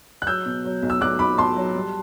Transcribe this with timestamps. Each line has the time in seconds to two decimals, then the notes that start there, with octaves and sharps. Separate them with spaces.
0.22 F#6
0.27 F#3 E6 G6
0.46 B2
0.65 F#3
0.83 B1
0.90 E6
1.01 B1 D6 F#6
1.19 B1 B5 D6
1.38 B1 A5 C6
1.56 F#3
1.75 G3